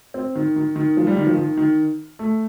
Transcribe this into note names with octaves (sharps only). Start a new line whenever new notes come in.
C4
D#3
D#3
D#3
F3
G3
D#3
F3
D#3
D#3
A3